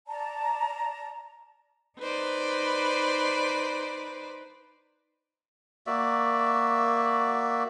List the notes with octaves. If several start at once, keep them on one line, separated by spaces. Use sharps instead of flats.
D5 A5 A#5
D#4 B4 C5 D5
A#3 F#4 D5 E5